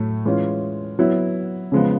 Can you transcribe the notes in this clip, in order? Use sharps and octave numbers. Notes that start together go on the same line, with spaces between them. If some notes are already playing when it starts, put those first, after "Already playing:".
Already playing: A2 F#3 A3
E3 G#3 C#4 F4
F#3 B3 E4
C#3 F3 G#3 B3